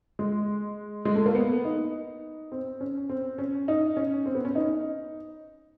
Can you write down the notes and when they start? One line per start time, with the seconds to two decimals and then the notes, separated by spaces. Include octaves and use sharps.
0.19 G#3
1.05 G#3
1.15 A3
1.26 A#3
1.35 B3
1.65 D#4
2.52 C4
2.81 C#4
3.09 C4
3.38 C#4
3.68 D#4
3.97 C#4
4.26 C4
4.35 B3
4.45 C#4
4.55 D#4